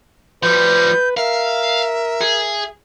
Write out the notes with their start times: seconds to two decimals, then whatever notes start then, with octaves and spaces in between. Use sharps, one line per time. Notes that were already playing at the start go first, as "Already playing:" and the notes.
0.43 F3 G3 B4 G6
1.17 A#4 E5 F5
2.21 G#4